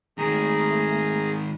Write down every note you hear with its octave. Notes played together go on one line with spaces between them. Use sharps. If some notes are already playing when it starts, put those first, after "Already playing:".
G#2 D#3 A3 G#4 A#5